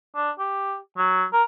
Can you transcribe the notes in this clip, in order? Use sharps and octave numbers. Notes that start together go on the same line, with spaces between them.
D4
G4
F#3
A#4